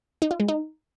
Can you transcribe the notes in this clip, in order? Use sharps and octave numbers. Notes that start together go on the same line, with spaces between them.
D#4
F4
G#3
D#4